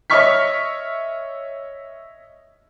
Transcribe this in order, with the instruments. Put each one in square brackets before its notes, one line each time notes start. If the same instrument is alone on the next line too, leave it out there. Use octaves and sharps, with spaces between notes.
[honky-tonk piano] C#5 D#5 E5 C#6 F6 B6